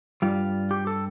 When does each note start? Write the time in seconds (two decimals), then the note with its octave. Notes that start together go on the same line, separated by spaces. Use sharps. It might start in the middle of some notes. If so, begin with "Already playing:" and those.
0.22 G2 G3 F4
0.71 G4
0.87 A4